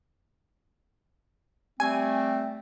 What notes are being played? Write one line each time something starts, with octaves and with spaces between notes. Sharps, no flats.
G3 A3 C4 G#5